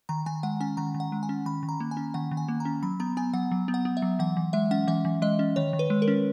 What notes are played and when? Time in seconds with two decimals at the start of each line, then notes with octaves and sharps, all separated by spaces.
0.09 D#3 A#5
0.26 D#3 G#5
0.43 G#3 F#5
0.60 C#4 G#5
0.77 D#3 A#5
0.94 D#3
1.00 F#5
1.12 G#3
1.23 G#5
1.29 C#4
1.46 D#3 B5
1.63 D#3
1.69 A#5
1.80 A#3
1.91 G#5
1.97 C#4
2.14 D#3 F#5
2.31 D#3
2.37 G#5
2.48 A#3
2.60 A#5
2.65 C#4
2.83 F#3 B5
3.00 B3 A#5
3.17 B3 G#5
3.34 F#3 F#5
3.52 F#3
3.68 B3
3.74 F#5
3.85 B3
3.97 E5
4.02 F#3
4.19 E3 F#5
4.37 E3
4.53 G#3 E5
4.71 C#4 F#5
4.88 E3 E5
5.05 E3
5.22 G#3 D#5
5.39 C#4
5.56 D#3 C#5
5.73 D#3
5.79 B4
5.90 G#3
6.02 A#4
6.08 C#4